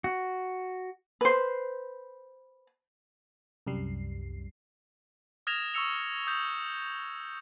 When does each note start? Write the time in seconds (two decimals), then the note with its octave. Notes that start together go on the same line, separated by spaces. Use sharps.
0.04 F#4
1.21 B4 C5
3.67 C2 F#2 G3 C7
5.47 D#6 F6 G#6 A#6 E7 F7
5.74 C#6 D#6 E6 C#7 F7
6.27 D#6 G6 F7